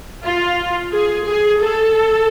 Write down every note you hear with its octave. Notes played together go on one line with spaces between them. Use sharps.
F4
G#4
G#4
A4